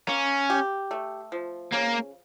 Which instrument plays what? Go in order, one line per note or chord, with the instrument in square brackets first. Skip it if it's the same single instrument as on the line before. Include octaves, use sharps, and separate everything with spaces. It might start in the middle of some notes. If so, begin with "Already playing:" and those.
[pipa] A#3 [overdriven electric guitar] C#4
[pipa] G4
A3
F3
[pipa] C#3 [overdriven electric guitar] A#3